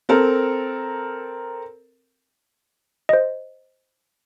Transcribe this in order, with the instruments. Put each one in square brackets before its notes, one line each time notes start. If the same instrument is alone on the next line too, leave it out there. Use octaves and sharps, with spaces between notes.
[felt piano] C4 A4 A#4
[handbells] C5 D#5